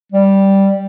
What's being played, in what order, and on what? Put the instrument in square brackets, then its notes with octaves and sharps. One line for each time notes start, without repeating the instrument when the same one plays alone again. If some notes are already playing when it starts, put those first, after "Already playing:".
[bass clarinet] G3